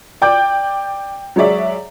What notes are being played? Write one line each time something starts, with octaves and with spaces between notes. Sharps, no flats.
D5 G5 D6 G6
F#3 G#3 G#4 C#5 D5 E5